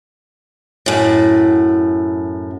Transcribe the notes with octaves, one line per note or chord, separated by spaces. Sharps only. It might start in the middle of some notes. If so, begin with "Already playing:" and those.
F#2 A2